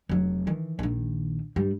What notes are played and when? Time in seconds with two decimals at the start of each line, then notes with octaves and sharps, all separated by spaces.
0.09 F1 F#3
0.47 D#3 E3
0.79 A#1 D#3
1.56 G2 G3